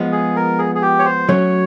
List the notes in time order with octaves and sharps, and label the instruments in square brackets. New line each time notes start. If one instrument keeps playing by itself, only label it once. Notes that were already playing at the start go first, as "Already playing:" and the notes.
Already playing: [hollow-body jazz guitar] F3 G#3 B3
[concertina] G#4
A#4
G#4
G#4
G4
C#5
C5
[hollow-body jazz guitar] F#3 A3 C#4 [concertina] C#5